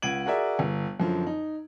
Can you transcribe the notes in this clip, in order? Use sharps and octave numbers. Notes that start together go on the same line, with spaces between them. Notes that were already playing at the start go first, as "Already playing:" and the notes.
C#2 F#5 G#6 D7 D#7 F#7
F#4 G#4 A#4 D5 E5
G1
F#2 D3 F3
D#4